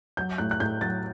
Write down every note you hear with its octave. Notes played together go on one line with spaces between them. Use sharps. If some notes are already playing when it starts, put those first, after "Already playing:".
F#3 G6
A2 F#6
F#6
A2 G6
F#3 A6